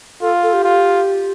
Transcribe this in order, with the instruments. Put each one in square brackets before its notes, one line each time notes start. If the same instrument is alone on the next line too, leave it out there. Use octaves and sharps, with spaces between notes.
[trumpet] F4 [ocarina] A4
[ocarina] A4
G4
[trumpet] F4